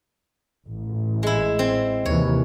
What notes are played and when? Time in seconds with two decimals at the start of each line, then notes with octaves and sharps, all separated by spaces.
0.66 A1
1.23 G#3 E4
1.59 C4
2.05 D#2 C3 E3 C#5